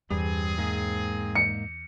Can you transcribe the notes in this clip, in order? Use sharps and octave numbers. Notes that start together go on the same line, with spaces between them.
E2 G2 G3 C4 G#4
G#2 A#3
C#7